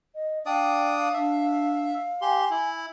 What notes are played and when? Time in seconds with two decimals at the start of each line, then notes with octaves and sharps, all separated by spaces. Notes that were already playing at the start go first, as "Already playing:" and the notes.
0.15 D#5
0.46 D4 D5 F5 G5 D#6
1.14 D4 E5
2.22 G4 G#5 C6
2.51 E4